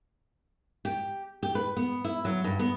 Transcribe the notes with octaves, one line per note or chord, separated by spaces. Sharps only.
G4
G4
B4
B3
E4
F#3
G2
B3